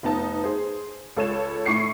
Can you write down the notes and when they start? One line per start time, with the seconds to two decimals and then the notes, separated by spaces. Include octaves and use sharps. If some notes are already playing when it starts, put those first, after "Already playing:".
0.03 F1 B3 D#4 A5
0.44 G#4 C5
1.17 C#2 A4 C#5 E7
1.66 A2 C#6 D6 C7 C#7